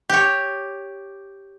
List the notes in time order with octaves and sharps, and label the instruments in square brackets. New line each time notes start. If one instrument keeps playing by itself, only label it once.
[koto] G4 C#5